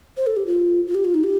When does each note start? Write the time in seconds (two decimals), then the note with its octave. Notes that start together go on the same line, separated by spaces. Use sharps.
0.17 C5
0.27 A4
0.36 G4
0.46 F4
0.87 F4
0.95 G4
1.05 F4
1.14 D#4
1.24 G4